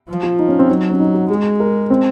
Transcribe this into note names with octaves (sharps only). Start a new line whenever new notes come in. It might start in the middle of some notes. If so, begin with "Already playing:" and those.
F3
F4
D#4
C#4
C4
F#3 D#4
C#4
D#4
F#4
G#3 G#4
A#4
C4